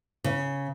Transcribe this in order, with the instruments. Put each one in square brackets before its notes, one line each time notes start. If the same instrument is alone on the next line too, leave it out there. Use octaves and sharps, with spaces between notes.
[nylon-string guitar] C#3